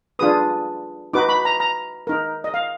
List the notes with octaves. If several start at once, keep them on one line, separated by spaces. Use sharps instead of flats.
D4 F4 G#4 B4 D#6
D#4 F#4 B4 D6
B5
A#5
A#5
D#4 A#4
D#5
F5